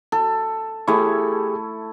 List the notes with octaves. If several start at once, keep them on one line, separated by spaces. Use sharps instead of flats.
A4
A3 E4 G4 G#4 C#6